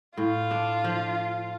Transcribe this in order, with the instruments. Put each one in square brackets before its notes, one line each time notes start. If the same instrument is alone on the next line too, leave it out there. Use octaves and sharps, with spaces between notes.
[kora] A2 [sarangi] F4
[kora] D4
F3